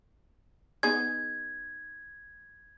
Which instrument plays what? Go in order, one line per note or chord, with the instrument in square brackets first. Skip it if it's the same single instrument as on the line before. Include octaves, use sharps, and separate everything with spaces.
[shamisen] B3 D#4 G#4 [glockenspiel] G#6